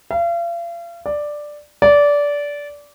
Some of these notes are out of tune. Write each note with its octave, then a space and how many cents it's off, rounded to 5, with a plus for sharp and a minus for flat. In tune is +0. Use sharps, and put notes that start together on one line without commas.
F5 -40
D5 +5
D5 -20